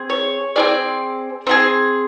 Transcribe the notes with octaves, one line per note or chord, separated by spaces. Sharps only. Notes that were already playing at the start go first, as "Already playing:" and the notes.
Already playing: C4 G#4
C#5
C4 F4 G#4 D5
C4 F4 G#4